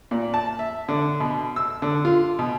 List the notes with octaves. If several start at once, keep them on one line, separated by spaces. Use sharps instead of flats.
A#2
A5
E5
D3
B2
E6
D3
F4
B2